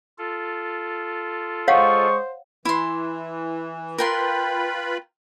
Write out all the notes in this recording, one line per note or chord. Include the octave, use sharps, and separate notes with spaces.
F4 A4
G#3 C5 C#5 D#5 F5 F#5 C#6
E3 E4 C6
F4 A#4 B4 G5 B5 C6